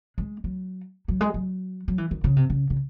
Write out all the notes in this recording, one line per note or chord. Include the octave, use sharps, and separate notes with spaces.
G#3
F#3
F#3
G#3
F#3
F#3
E3
D#3
C#3
C3
C#3
C#3